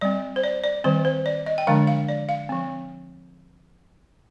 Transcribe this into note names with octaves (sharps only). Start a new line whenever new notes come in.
G3 C4 D5
C5
D5
D5
D#3 G3 C4 C5
C5
D5
D#5
G5
D3 F3 G#3 D4 F5
F5
D5
F5
F3 C4